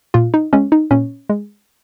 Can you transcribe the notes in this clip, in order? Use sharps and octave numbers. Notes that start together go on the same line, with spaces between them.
A#2 F4
D#4
G#3 C#4
D#4
A#2 C#4
G#3